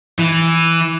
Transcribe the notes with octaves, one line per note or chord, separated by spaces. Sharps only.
E3